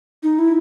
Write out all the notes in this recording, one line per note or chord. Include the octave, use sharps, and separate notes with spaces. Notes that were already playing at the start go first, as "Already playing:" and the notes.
D#4
E4